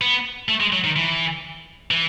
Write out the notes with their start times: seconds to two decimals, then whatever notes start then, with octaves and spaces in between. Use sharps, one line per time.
0.01 B3
0.49 A3
0.61 G#3
0.73 F#3
0.84 D#3
0.96 E3
1.91 E3